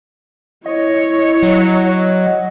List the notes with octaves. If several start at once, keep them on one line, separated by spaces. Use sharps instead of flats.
E4 C#5 D#5
F#3